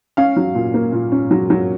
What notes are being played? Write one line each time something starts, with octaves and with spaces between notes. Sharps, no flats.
C#4 F5
F#3
A#2
A#3
A#2
C#4
F#3
F#3